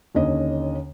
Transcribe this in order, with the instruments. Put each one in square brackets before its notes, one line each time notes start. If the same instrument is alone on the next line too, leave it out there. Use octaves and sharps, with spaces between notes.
[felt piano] D#2 D3 C#4 D#5